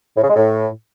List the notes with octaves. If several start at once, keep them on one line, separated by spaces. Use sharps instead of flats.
A2
C#3
G#3
A2